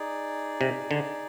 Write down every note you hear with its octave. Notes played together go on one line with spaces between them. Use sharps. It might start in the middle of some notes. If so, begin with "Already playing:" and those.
Already playing: D#4 G#4 D5
C3
D3